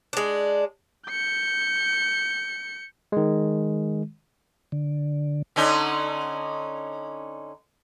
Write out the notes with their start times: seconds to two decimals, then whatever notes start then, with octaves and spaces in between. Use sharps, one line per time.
0.13 G#3 D4
1.09 G6 C#7
3.12 D#3 G#3
4.72 D3
5.56 D3 C#4 D#4